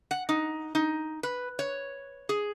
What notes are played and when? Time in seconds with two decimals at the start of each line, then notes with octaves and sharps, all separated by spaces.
0.11 F#5
0.29 D#4
0.75 D#4
1.23 B4
1.59 C#5
2.29 G#4